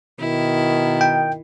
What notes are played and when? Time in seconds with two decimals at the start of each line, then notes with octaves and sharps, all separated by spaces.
0.20 B2 D#3 E4
1.01 G5